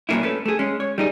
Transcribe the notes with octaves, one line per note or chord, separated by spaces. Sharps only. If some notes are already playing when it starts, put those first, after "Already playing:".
G2 A#2 F#3 A#3 C#4 E4
A3 C#4 A4 B4
A3 G#4
G#3 C#4
C#5
G3 D#4 G#4